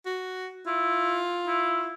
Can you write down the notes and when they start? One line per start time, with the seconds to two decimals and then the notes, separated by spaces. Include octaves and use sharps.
0.05 F#4
0.67 E4 F4
1.47 E4